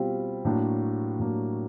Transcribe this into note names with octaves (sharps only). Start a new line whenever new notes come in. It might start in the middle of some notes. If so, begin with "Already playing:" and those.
Already playing: B2 G3 C4 F4
A2 F#3 A#3 D4
A2 F#3 A#3 D4